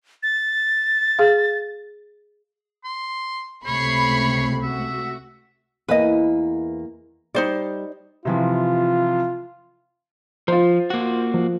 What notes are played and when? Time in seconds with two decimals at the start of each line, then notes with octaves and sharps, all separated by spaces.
0.23 A6
1.19 G#4 F5
2.84 C6
3.66 C#2 C3 A3 C#5 B5 C#6 C7
4.63 F#4 E5
5.88 E2 A#3 B4 D#5
7.35 G3 D#4 C5 D5
8.25 C3 E3 F3 F4
10.48 F3 F4 C5
10.90 A#3 F#4
11.34 F3